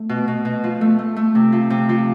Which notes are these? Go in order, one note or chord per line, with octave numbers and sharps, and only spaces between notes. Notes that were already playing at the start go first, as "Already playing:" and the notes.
Already playing: A3
B2
B2
B2
F3
A3
A3
A3
C3
F3
C3
F3